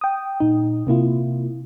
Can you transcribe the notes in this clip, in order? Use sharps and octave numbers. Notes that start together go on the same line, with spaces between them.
G5 D#6
A#2 D#4
C3 A#3 E4 F4